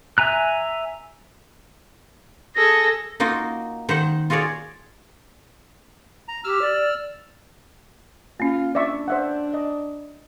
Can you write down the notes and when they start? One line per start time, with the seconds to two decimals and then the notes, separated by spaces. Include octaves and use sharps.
0.18 E5 G#5 A#5 F#6
2.55 G#4 A4 A#6
3.20 A#3 D#4 F4 F#4
3.89 D#3 C5 F#5
4.30 F4 F#4 G#4 C#5 D5
6.28 A#5
6.44 G4 E6 F6
6.61 D5
8.40 A#3 C#4 F4
8.75 D4 D5 E5 C#6
9.08 C5 E5 F#5
9.54 D#5